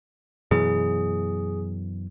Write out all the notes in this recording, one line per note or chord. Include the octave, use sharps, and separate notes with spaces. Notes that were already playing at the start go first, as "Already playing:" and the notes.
F#2 B2 E3 G#4